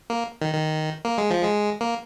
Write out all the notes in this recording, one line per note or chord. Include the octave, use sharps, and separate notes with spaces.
A#3
D#3
D#3
A#3
G#3
F3
G#3
A#3